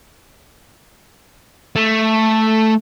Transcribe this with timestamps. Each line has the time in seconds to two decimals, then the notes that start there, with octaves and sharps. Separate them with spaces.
1.76 A3